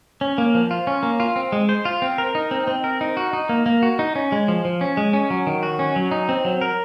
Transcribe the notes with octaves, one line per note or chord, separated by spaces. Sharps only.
C#4
A#3
F3
F4
C#4
A#3
F4
C4
G#3
C5
F4
C4
A#4
D#4
C4
C4
A#4
D#4
F#4
D#4
A#3
A#3
F#4
D#4
C#4
G#3
F3
F3
C#4
G#3
C#4
F#3
D#3
F#4
C#4
F#3
D#4
C4
F#3
A#4